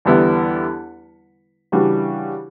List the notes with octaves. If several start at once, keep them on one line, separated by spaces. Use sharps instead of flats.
E2 D3 G3 B3 E4
C#3 E3 G3 D4 F#4